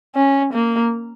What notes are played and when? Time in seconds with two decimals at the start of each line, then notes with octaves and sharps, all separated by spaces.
0.16 C#4
0.53 A#3